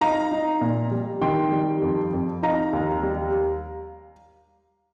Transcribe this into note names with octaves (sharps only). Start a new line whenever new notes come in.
D#4 F5 A#5
D#4
A#2
G3
D#3 G5 C6
G3
F2
F2
D#4 F5 A#5
D#2
G3